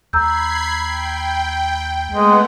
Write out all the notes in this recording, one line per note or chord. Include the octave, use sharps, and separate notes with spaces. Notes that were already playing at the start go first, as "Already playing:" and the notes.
D#2 A#5 B5 E6 G6 G#6 C7
G5
G#3 A3 B3 F#5